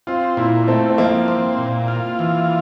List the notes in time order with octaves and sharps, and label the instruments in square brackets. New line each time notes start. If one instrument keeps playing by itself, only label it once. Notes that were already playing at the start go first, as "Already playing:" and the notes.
[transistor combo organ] C4 [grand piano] F4
[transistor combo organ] A#2 [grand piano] E4
[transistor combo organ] A3 [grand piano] C4
[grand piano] C4
[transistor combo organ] F3 [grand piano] A#3
[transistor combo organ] C4
A#2
F4
E3